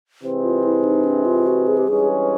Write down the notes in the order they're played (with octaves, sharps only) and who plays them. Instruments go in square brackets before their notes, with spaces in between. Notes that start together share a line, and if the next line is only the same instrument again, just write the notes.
[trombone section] C3 E3 G#3 C4
[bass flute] F4
E4
D#4
D4
F4
F#4
G#4
G4
[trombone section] G2 E3 G#3 C#4 [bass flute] G#4